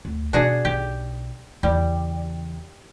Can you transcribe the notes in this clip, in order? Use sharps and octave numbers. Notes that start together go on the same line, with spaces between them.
D2
B2 F#3 D4 F#4 G#4
B1 G4
E2 C#3 G3